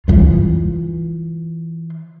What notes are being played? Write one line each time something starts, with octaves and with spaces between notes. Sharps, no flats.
E3 F4